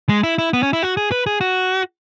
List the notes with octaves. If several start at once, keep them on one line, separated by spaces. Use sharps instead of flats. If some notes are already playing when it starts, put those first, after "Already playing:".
G#3
E4
E4
B3
C#4
E4
F#4
G#4
B4
G#4
F#4